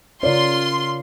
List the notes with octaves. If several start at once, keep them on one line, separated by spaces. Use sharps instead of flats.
C#3 F4 A#4 C#5 D5 C6